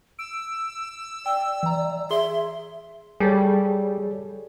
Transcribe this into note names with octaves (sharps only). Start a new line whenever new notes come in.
E6 D7
D5 G5
E3 A#5
G#4 E5 C6 G7
G3 G#4 A4 C#5